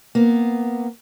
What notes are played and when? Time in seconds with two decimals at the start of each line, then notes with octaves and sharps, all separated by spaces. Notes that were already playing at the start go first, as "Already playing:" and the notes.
0.15 A#3 B3